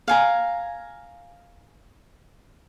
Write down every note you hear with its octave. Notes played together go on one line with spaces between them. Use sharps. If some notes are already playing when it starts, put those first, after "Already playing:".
F5 G#5 A#5